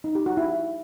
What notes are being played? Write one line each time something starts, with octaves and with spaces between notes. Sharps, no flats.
D#4
G4
F#4
E4